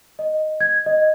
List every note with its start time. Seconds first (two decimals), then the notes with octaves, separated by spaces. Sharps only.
0.19 D#5
0.61 G#6
0.86 D#5